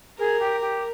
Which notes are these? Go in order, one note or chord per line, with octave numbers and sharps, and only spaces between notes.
G#4 A#4
G4
G4